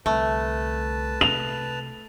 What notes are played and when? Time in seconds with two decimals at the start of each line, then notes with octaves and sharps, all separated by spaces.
0.06 C2 D3 A3 B4 A5
1.21 C3 F7